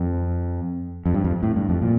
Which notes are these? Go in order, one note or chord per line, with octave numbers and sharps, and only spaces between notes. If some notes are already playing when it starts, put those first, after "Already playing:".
Already playing: F2
F2
G2
F2
A2
G2
F2
A#2